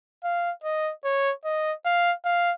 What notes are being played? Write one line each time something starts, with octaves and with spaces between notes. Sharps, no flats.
F5
D#5
C#5
D#5
F5
F5